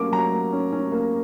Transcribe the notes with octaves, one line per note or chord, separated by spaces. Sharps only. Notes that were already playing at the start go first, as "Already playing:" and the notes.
Already playing: F#3 A#3 C#4 D6
F#3 A#5
A#3
C#4
C#4
A#3